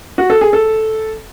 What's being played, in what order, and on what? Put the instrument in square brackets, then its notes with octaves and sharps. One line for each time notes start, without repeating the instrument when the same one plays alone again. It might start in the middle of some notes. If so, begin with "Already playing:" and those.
[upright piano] F#4
A4
G#4
A4